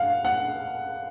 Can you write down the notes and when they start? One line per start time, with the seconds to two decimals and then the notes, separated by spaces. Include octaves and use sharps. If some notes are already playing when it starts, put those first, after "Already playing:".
Already playing: F5 F#5
0.25 F#5